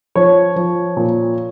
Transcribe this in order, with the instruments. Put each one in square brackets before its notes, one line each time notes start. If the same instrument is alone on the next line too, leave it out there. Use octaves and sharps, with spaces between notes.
[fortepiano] F3 C#5
F3
A#2